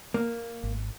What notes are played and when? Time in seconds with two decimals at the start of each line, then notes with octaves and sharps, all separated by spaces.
0.14 A#3
0.63 G#1